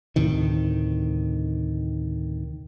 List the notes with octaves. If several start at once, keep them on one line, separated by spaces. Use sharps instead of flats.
D2 A2 C3 D#3